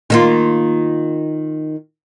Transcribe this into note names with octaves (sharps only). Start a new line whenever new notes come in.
D#3 A#3 F4